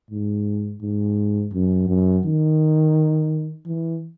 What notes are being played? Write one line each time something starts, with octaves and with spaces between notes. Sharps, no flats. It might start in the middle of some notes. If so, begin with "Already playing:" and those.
G#2
G#2
F#2
F#2
D#3
E3